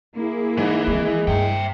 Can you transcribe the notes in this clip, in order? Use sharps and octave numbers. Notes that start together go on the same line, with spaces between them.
A#3 E4 G#4
G#2 E3
D#3 G#3 C4
G2 E5 G5